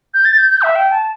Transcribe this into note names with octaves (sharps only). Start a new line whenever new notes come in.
G6
A6
G6
G6
E5
G5
A5